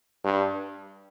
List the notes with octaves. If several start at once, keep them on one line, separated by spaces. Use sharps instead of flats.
G2